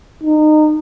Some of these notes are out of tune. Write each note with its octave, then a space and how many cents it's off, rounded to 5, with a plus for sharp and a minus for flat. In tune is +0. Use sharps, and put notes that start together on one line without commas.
D#4 -25